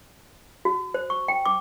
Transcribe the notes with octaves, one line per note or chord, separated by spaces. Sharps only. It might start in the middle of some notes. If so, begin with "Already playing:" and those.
F#4
C5
C#6
G5
D6